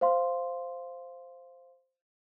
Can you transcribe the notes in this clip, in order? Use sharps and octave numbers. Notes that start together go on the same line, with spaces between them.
C5 F5 C6